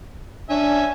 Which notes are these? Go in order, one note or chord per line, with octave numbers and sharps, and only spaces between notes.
C#4 D4 E5 G#5